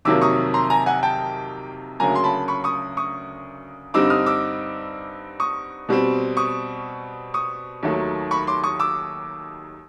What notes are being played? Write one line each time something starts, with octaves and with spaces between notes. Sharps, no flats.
F2 C3 D#3 F#3 A#3 D6 E6
C#6 D#6
A#5 C6
G#5 A#5
F#5 G#5
G5 A5
D2 C#3 F#3 A#3 G#5 A#5
C6
A5 B5
B5 C#6
C#6 D#6
C#6 D#6
G2 D3 G3 C4 D#4 D6 E6
D#6 F6
D6 E6
C#6 D#6
B2 G3 C4
C#6 D#6
C#6 D#6
D#2 D#3 F#3 A3
B5 C#6
C6 D6
C#6 D#6
D6 E6